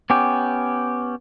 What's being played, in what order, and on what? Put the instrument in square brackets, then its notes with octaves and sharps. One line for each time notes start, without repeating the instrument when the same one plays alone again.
[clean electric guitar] B3 C#4 G4